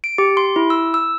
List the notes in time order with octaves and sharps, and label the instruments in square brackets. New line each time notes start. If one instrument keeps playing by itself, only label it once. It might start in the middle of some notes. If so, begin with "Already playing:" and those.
[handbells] D7
G4
C6
E4
E6
E6